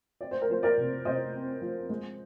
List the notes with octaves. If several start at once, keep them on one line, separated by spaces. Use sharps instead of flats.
C4 D5
C5
A#4
F3 C5
A#4 D5
C3
C3 C5 D#5
C4
F3
G#3